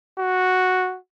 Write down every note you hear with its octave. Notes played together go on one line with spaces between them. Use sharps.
F#4